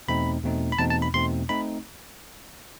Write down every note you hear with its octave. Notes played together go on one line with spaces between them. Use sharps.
E2 B2 A3 C4 D#4 B5
E2 B2 A3 C4 D#4
B5
E2 B2 A3 C4 D#4 A5
A5
B5
E2 B2 A3 C4 D#4 C6
A3 C4 D#4 B5